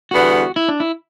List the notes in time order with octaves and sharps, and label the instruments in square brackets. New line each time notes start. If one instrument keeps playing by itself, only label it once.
[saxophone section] E2 D3 G3 B3 [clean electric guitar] F#4
[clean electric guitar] E4
D4
E4